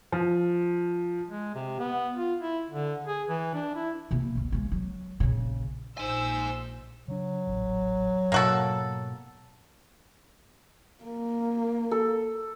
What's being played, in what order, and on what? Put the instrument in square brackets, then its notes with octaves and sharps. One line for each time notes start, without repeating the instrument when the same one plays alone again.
[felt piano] F3
[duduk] G#3
C3
B3
F4
E4
D3
G#4
E3
D4
E4
[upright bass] C3 A#3
G1 D2
C#3 G#3
F#3
A#1 C#3
[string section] A#1 C5 E6 [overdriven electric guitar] D#4 G#5
[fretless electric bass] C#3 D4 [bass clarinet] F#3
[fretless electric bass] D#1 A1
[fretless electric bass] G#2 B2 [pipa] A#3 F#4 A4
[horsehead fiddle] A#3
[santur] A4